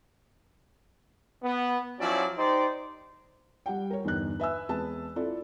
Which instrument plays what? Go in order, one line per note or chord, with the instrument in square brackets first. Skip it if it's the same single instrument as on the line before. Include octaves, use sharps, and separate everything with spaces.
[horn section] B3
F3 F#3 C#4 E4 D5
D#4 G4 C5 D5
[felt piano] G3 F#5 G5
A#4 C#5
E2 G2 D3 D#4 F#6
B4 E5 G#5 E6
E2 G#3 C4 G#4 B4 A5
C4 E4 F4 A4 D5